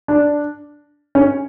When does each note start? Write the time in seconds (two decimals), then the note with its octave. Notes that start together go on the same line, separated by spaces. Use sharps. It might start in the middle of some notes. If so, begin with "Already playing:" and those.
0.08 D4
1.15 C#4